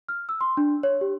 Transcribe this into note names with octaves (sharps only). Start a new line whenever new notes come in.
F6
E6
C6
D4
C#5
G4